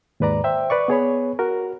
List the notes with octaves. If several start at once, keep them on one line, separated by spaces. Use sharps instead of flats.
D#2 G#2 B4 D5 A#5
C5 E5 G5
B4 D5 C#6
B3 G#4 C#5 B5
F#4 A#4